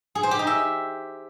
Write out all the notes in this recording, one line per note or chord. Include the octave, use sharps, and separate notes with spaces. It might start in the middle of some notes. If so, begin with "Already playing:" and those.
G#4
C5
G4
D#4
E5